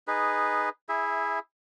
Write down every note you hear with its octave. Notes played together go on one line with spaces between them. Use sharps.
D#4 G#4 B4
E4 G#4 E5